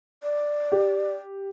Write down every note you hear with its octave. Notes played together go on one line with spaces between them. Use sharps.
D5
G4